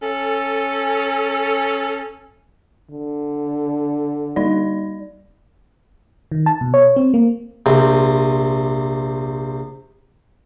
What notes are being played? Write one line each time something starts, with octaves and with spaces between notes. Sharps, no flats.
C#4 A4
D3
G3 D#4 D5
D#3
A5
B2
C#5
C4
A#3
A#1 C3